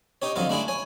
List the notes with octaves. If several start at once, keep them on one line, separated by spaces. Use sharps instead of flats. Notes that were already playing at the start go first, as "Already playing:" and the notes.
D#4 G4 C#5
F2 D3 F#3 D#4 F4
A3 D4 E4 G#4
C#5 G#5